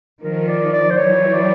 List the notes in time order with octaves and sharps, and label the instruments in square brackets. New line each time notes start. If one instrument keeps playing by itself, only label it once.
[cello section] D#3 F3 [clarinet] A#4
[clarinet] D5
D5
C5
[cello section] E3 F#3 [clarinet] C#5
[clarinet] D5